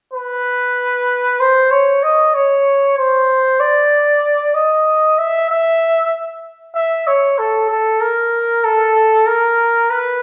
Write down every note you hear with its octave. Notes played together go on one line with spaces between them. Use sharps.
B4
C5
C#5
D#5
C#5
C5
D5
D#5
E5
E5
E5
C#5
A4
A4
A#4
A4
A#4
B4